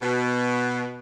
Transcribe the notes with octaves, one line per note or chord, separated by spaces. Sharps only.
B2